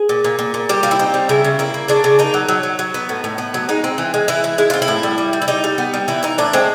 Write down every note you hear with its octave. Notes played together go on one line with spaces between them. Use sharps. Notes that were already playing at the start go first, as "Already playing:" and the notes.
Already playing: G#4
A#2
A#2
A#2
A#2
G3 G4
C4 F4
E4
C4 D#4
G3
C#3 E4
C#3
A#3 E4
A#3
C#3 D4
C#3
A#3 D#4
F#3
F#3
F#3
F#3
B3
A2
A2
B3
F#3
G#3 D#4
C4
E3
G#3
E3 E4
E3
G#3 E4
C4 F4
E4
A2
G3
G3
G3
E4
G3 D#4
G3
B3
G3
E3 E4
E3 D#4
A2 D4
G#3 C4